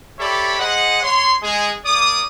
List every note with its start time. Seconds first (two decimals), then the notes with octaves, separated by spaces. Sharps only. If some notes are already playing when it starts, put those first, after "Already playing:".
0.19 G4 A4 C#5 D5 E5 B5
0.59 G#4 C5 D#5 F#5
1.03 C#5 C6
1.42 G#3 G#4
1.85 A#3 D5 D6 D#6